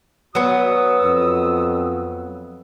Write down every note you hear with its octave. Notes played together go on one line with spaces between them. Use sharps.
F#3 B3 F#4 D#6 E6
F2